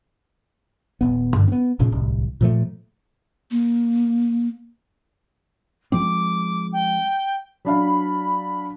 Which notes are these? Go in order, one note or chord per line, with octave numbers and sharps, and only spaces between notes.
D#1 B3
G2 D3
B3 C4
F1 A#2 C#3
D1 C2
A#2 F3 A3
A#3
F3 G#3 C4 D6
G5
F#3 D4 F5 B5